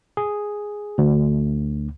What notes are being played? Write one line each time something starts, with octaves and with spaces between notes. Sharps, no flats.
G#4
D2